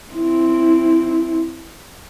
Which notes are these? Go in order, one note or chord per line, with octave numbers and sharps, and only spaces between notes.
C4 E4